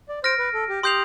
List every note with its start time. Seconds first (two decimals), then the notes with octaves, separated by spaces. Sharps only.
0.09 D5
0.24 C5 F6 A#6 D7
0.39 B4
0.54 A4
0.69 G4
0.83 G4 C6 D#6 G6 C7 F7